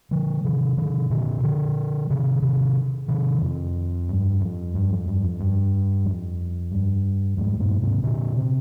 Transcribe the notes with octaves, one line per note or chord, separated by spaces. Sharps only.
D3 F3
C3 D#3
C3 D#3
A#2 D3
D3 F3
C3 D#3
C3 D#3
C3 D#3
F2
G2
F2
G2
F2
G2
F2
G2
F2
G2
F2 G#2
G2 A#2
G#2 C3
A#2 D3
C3